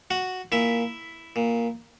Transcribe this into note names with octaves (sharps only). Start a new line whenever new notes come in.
F#4 F#5
A#2 E4 E5
A#2